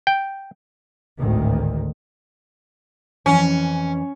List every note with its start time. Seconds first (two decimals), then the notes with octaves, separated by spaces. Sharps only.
0.07 G5
1.17 G#1 D2 A2 D#3
3.26 F2 E3 C#4